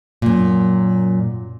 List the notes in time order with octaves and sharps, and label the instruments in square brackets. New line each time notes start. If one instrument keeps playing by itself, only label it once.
[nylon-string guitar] F#2 A#2